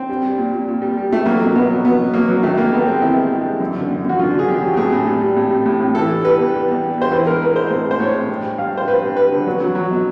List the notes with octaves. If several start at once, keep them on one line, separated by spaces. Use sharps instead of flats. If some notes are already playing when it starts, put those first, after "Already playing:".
Already playing: C4
G3
G3
A#2
A#2
A#2
G3
G3
G3 A3
F#3 A#3
B2
B2 B3
F#3
F#3 B3
B2
F#3 A#3
F#3
D#3 A3
G#3 A#3
G2 B3
G#3 C4
D#3 E4
G#3
G2
G#3
F#2
D3
F#2
F#2 F#4
D3 F4
D3
G#4
F#2 G4
F#3
G4
A2 G#4
A2
G3
G3
A2
G3
A2
A2
E3 A4
G3
G3 B4
E2
G3
E2
G3
E2 C5
E3 B4
G#3 A#4
G#3 B4
G#3 C5
A2
G#3
C5
A2 C#5
G#3
G2
G2
G2 F5
G2 C5
G2 B4
G2
G2 B4
D3
F#3
F#3
F#3
B2